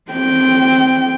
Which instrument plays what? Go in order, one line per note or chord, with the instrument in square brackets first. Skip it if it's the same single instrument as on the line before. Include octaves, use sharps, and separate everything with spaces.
[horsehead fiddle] C4 G5